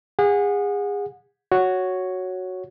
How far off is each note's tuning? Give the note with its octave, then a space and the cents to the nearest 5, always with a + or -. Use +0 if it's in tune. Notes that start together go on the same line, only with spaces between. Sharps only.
G#4 -30 F#5 -30
F#4 +0 C#5 +0